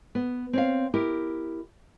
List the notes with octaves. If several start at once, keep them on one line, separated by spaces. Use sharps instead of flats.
B3
C4 C#5 F5
E4 G4 A#4